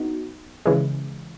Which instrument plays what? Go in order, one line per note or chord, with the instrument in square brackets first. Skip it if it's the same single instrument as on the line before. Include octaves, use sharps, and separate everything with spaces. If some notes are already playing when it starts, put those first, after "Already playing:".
Already playing: [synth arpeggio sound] B3 D#4 F#4
C#3 E3 G#3